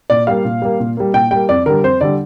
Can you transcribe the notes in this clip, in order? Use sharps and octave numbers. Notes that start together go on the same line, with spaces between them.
A#2 D5
G3 A#3 F5
A#2
G3 A#3
A#2
G3 A#3
A#2 G5
G3 A#3 G5
F2 D5
D3 G3 A#4
F2 C5
D3 G3 D5